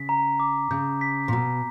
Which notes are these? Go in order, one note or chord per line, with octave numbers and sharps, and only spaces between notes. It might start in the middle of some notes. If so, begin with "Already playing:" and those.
Already playing: C#3 B6
A#5
D6
C#3 G6
B6
A#2
B2 A#5